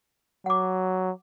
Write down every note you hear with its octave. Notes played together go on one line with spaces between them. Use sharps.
F#3 F#5 D6